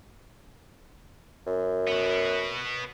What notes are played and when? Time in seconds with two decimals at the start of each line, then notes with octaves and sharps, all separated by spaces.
1.47 F#2
1.87 B3 F#4